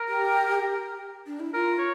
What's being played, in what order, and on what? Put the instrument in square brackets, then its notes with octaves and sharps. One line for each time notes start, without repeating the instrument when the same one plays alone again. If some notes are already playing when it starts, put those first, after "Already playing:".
Already playing: [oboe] A#4
[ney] G4
D4
E4
[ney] F4 [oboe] A#4
[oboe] C#5